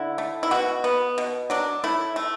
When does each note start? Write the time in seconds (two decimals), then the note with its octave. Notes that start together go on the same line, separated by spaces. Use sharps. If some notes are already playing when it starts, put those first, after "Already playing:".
Already playing: D3 E4
0.18 A3
0.43 E4
0.51 B2 F#4
0.84 B3
1.18 B2
1.50 F#3 D4
1.84 A3 E4
2.16 A3